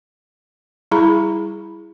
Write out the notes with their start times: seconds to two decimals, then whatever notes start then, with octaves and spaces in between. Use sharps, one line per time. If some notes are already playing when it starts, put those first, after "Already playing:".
0.91 G3 E4 G#4 A#5 B5